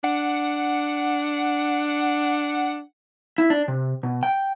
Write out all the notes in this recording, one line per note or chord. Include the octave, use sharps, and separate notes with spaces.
D4 F#5
E4
D4
C3
B2
G5